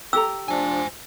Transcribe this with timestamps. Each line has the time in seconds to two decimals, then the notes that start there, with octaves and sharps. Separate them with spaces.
0.13 G4 A4 A#5 E6
0.48 F3 D4 C5 G#5